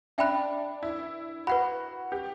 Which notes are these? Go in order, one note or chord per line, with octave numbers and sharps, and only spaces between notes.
D4 E5 G5 B5 F#6
E4
F#4 B4 F#5 B5
G4